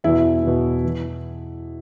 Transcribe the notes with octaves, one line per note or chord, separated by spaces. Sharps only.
E2 B2 E4
E2 B2
E3